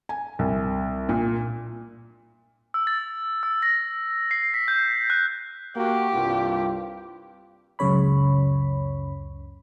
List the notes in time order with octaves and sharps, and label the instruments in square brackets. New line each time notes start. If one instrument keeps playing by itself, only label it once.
[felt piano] G#5
C2
A#2
[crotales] E6
A6
E6
A#6
C7
B6
G6
F#6
[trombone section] A#3 F#4 [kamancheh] G4
[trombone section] C2 G2 F4
[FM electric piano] C#2 F#2 C#3 C#5 B5